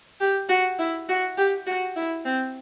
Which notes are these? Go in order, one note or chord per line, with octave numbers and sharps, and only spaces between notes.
G4
F#4
E4
F#4
G4
F#4
E4
C4